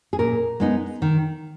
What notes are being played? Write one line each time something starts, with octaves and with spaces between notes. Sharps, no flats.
G#4
A#2 A#4
G#3 B3 D#4
D#3